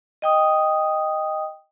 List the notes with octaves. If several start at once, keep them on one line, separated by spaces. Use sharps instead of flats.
D#5 G5 D#6